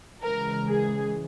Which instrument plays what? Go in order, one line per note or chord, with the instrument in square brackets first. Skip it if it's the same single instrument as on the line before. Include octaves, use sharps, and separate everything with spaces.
[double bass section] C#3 E3 G#3 [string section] A#4
[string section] G#4